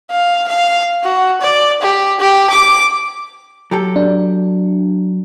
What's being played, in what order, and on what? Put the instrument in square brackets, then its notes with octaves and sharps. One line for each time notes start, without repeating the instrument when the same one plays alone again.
[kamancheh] F5
F5
F#4
D5
G4
G4
D6
[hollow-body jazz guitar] F#3 G4 A4
[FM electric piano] D4